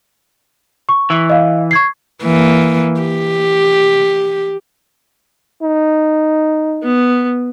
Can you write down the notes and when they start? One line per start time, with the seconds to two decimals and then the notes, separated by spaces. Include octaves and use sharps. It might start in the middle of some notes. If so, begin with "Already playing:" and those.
0.89 C#6
1.10 E3
1.30 D#5 F5
1.71 C#6 G#6 C7
2.23 E3 A#3
3.01 G4
5.62 D#4
6.83 B3